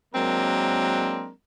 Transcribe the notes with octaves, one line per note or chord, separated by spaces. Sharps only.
F#3 G#3 A#3 C4 D4 A#4